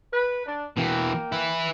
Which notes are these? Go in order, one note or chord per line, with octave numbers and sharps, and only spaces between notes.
B4
D4
B2 E3 A#3 G5
E4 B4